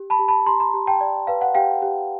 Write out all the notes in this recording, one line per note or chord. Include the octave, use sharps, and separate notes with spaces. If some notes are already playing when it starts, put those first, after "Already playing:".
Already playing: G4
A5 B5
G4
A5 B5
G4 A#5 C6
A#5 C6
G4
G5 A5
D5
B4 F5
F#5
G4 F5 G5
G4